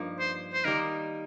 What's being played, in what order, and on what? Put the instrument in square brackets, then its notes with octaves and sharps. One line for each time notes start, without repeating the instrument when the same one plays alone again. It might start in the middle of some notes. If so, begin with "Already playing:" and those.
Already playing: [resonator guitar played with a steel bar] G2 F3 A#3 D#4
[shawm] C5
C5
[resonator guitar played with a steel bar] D#3 G3 A#3 D#4 [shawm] A#4